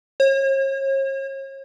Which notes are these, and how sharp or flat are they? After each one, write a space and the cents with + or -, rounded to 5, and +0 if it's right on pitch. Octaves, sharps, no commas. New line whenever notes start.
C#5 -40